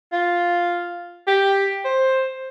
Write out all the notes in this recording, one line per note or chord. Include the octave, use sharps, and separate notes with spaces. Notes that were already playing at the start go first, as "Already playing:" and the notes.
F4
G4
C5